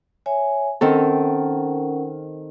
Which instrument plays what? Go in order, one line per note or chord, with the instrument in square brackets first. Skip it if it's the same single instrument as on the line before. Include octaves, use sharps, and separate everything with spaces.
[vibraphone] C#5 E5 G#5
[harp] D#3 C4 A4 [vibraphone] C#4 A#4 F#5